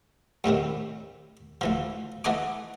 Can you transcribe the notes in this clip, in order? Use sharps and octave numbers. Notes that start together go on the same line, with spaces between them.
F#2 A2 C3 D#3
D2 E3 F3
E3 A3 D#5 F#5 G#5 D6